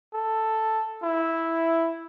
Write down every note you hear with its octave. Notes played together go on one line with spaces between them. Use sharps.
A4
E4